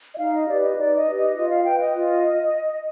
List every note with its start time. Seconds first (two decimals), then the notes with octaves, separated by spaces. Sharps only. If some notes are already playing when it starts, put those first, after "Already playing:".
0.14 D#5
0.19 D#4 F5
0.33 D#5
0.48 G4 B4 D5
0.63 D#5
0.77 D#4 D5
0.97 D#5
1.06 G4 B4
1.15 D#5
1.35 F4 D#5
1.50 F5
1.64 B4 G5
1.80 D#5
1.94 F4